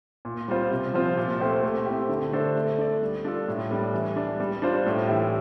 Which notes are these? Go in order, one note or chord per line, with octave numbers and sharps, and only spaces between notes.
A#2
G3 C4 F4 C5
C3
F3 C4 F4 C5
A#2
A3 C4 G4 C5
A3
C4 E4 G4
D3
A3 D4 A4 C5
A3
D4 A4 D5
G3
D4 F4 A4
A2
G3 D4
E3
G3 D4
G3
D4 F4 C5
A2
E3 A3 E4 G4